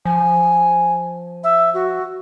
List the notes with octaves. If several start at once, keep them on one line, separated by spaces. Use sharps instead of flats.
F3 G#5
E5
F#4